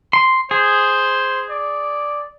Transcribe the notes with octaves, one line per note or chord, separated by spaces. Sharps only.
C6
G#4 C5
D5